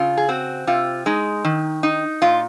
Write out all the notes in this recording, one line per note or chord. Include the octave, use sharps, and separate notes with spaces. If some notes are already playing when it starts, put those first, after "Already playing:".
Already playing: C#3 F4
G#4
C4 F#4
C3 F4
G#3 D#4
D#3
D#4
A#2 F4